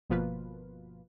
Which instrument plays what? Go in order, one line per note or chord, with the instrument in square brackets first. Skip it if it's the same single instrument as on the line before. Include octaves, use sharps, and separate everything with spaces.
[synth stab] G1 B2 F3 A#3 F4 B4